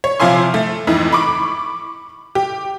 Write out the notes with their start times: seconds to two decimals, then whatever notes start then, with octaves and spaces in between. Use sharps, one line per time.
0.04 C#5
0.20 C3 F3 F5 G#5 C6
0.54 A3
0.87 F2 G#2 E3
1.13 B5 C#6 D6
2.35 G4